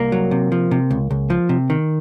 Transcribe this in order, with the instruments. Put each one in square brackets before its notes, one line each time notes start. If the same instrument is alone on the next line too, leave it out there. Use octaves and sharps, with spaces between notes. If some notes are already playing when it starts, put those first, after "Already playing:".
Already playing: [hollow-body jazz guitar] C2 A#3
F#3
C3
F3
C3
C#2
C#2
F3
C3
D#3